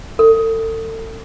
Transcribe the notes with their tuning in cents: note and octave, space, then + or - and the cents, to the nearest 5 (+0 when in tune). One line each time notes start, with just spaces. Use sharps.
A4 +35